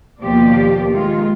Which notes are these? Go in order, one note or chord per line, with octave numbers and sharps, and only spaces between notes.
D#2 B2 F3 A#3 G4 D5
D#3 G#3 F4